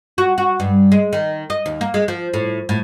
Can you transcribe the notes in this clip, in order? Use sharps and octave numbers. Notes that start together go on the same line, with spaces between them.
F#4
F#4
G2
G#3
D#3
D#5
D#2
A#3
G#3
F3
A2
A2